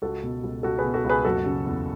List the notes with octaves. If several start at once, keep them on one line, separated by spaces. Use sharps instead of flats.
C#2 F#4 A4
B2
C#2
C#2 F#4 A4
G#4 B4
B2
F#4 A4
C#2
G#4 B4
F#1 F#4 A4
C#3
E2